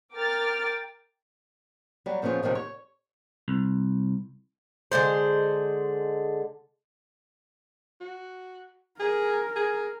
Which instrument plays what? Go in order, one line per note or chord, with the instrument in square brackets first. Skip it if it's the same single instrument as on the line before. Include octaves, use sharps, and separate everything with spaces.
[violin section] A#4 G5 D6 F6 A6
[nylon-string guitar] F#3 G3
F2 C#3 F3 B3 C#4 F4
D2 C3 D#3 F3 F#3
C#5
[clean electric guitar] C2
[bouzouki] D3 G#3 B3 C5
[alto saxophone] F#4
[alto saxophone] G#4 [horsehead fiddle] A#4
[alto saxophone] G#4